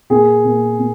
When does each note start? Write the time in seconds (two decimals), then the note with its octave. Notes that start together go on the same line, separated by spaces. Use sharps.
0.10 A#2 G#4
0.44 A#2
0.78 A#2